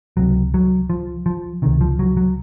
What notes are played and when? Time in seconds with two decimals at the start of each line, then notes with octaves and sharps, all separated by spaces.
0.17 C#2 C3 F#3
0.54 F#3
0.90 F3
1.26 F3
1.62 C#2 C3 D#3
1.81 F3
1.99 F#3
2.17 F#3